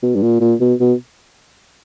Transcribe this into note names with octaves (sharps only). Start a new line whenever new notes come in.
B2
G2
A#2
A#2
B2
B2